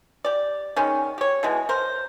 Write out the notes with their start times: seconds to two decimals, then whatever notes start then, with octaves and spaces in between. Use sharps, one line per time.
0.25 G4 D5
0.76 D#3 G#3 C#4
1.18 G4 C#5
1.43 B2 E3 G#3
1.69 A#4 C5